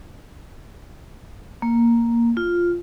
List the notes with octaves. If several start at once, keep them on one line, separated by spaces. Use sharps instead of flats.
A#3
F4